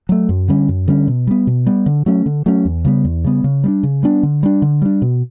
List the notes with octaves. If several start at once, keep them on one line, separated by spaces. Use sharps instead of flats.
F#3 A3
F#2
D3 G3 C#4
F#2
D3 G3 C#4
B2
G3 B3
B2
G3 B3
D3
F#3 A3 C#4
D3
F#3 A3 C#4
E2
C#3 G3 B3
E2
C#3 G3 B3
C#3
G3 B3 D4
C#3
G3 B3 D4
D3
G3 D4
D3
G3 D4
B2